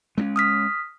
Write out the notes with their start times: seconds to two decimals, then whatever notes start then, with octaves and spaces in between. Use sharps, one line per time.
0.18 G#3 B3 C#4
0.36 D#6 F6 B6